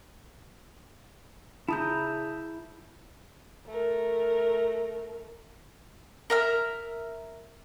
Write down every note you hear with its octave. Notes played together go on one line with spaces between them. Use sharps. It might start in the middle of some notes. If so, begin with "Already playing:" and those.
C#3 E4 A5 A#5 D#6 G6
A3 A#4
A#4 E5 F6